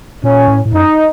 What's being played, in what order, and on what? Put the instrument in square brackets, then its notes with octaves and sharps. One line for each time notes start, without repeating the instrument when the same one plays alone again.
[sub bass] A#2 [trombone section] C#4
[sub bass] A2
A2
[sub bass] F#2 [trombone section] D#4